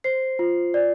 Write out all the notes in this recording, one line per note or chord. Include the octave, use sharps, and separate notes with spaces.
C5 C7
F4
D5